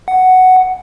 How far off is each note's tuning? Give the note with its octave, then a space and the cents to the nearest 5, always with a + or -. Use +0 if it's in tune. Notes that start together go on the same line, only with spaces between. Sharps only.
F#5 +5